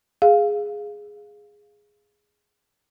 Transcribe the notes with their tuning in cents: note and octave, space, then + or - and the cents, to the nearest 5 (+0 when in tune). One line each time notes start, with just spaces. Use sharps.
G#4 +0 F5 +0